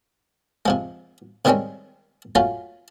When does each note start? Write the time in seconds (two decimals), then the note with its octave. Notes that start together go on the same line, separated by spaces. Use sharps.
0.66 C3 F3 G#3
1.45 C3 D#3 G3 G#3 C4 C#4
2.35 F#3 A3 C#4 F4